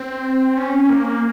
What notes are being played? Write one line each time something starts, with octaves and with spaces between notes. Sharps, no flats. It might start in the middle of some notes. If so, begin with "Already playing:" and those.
Already playing: C4
C#4
A#3